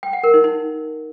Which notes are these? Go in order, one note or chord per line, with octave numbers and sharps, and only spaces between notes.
G5
F#5
A#4
D#4
D#4